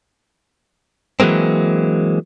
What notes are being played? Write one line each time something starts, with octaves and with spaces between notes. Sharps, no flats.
E3 F#3 G#3 A#3 C4